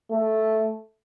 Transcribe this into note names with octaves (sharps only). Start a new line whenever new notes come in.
A3